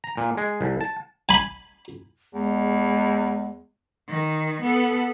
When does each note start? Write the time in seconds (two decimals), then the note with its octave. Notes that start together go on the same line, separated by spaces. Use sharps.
0.04 A#5
0.17 A#2
0.37 G#3
0.61 C2
0.81 A5
1.29 G#5 B5
2.34 E2 G#3
4.08 D#3
4.62 B3 A4